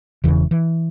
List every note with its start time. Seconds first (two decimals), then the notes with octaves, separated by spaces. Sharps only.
0.24 E1 E2 C#3 E3
0.51 E3